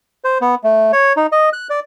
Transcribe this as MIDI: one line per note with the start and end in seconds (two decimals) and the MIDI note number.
0.24 0.38 72
0.41 0.55 59
0.64 0.92 57
0.93 1.13 73
1.17 1.27 63
1.32 1.49 75
1.53 1.68 90
1.70 1.80 74